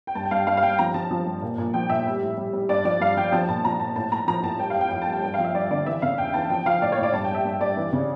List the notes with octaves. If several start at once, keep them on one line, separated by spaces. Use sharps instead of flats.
G5
G2 A5
G5
G2 F5
G2 F5
F5
G2 G5
F3 A#5
F3 A5
F3
G2
A#2
A#2
F3 G5
A#2 E5
G3
A2
G3
G3
G2 D5
F3 D5
G2 F5
F3 G5
F3 A5
A#2 A5
F3 A#5
A#2 A5
A2 A5
A2 A#5
F3 A#5
A2 A5
G3 G5
F5
F2
G5
F2 G5
A5
G3
G5
G2 G5
F3 F5
E5
G2 D5
D3 D5
E3 E5
C#3 F5
E2 G5
E3 A5
F3 G5
F3 F5
A2 D5
C#5
A2
D5
G2 A5
G5
G3
E5
G2
G2 D5
E3
C#3